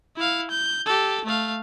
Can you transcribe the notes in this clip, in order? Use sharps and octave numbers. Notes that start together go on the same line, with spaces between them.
E4 F5
G6
G4 A4
A3 F5